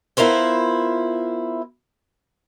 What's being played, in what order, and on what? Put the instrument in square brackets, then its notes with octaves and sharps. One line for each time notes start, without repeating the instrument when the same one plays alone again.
[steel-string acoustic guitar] B3 E4 F4 A#4 C5 E5